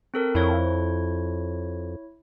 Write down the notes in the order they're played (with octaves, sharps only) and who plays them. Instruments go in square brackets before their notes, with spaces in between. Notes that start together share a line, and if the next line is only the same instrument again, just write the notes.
[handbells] C4 A4 A#4
[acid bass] F2 [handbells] E4 C#5